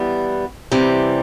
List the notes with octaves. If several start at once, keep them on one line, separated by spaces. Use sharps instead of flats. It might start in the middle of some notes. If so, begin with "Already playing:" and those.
Already playing: E3 G3 B3
C3 E3 G3